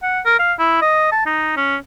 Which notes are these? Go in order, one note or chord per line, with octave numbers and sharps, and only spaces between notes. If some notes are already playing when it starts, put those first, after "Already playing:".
F#5
A#4
F5
E4
D#5
A5
D#4
C#4